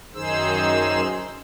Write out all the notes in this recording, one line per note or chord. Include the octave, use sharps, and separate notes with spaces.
F#2 D#3 D#4 G#4 C5 E6